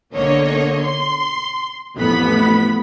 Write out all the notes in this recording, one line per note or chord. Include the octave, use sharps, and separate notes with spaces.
B1 D3 A#3 C#5 D#5
C6
A1 F2 B3 B5 B6